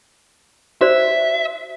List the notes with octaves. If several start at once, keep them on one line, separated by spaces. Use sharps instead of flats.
F#4 C5 D5 E5